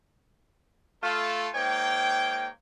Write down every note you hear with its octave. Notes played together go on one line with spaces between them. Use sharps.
A3 F4 A4
G#2 A#3 C#5 G5